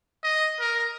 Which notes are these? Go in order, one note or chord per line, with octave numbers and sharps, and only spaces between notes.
D#5
A#4